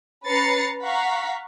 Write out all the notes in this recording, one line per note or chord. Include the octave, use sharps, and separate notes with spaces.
C#4 B4 A#5 A6 C7 C#7
F5 F#5 A#5 C#6 B6